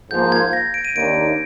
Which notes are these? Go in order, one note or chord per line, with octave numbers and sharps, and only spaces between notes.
G#2 F3 A#3 F4 G6
G#6
A#6
D7
D#7
D#2 D#3 A#3 D4 D7